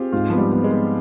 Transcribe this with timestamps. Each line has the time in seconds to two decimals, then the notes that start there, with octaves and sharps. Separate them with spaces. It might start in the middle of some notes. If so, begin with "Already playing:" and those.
Already playing: C4 F4 G4 G#4
0.12 G#2 F4
0.30 F3 B3
0.38 G3
0.52 B3
0.64 G#3
0.71 B3